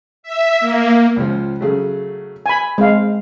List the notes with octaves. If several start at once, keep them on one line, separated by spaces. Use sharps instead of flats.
E5
A#3
C#2 F3
C#3 F#3 A3
G#5 B5
G#3 C4 F5